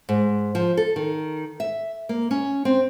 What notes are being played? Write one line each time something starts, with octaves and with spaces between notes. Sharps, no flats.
G#2
F3
A4
D#3
E5
A#3
C#4
C4